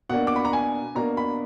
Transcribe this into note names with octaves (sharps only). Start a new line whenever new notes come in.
B2 A#3 D4 F#5
D6
B5
A#5
G#5
B2 A#3 D4 A#5
B5